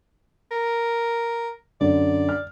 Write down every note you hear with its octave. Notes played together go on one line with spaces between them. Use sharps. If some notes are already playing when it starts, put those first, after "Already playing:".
A#4
F#2 D3 D5
F6